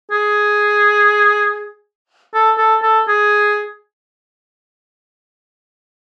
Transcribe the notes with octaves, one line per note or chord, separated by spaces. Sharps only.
G#4
A4
A4
A4
G#4